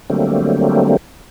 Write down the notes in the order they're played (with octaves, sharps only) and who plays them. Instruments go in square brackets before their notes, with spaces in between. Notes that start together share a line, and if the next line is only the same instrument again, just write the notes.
[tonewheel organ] D3 F#3 G3 A3 A#3 C4